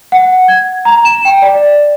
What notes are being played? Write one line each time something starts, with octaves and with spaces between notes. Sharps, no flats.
F#5
G#6
A#5
E7
G5
D5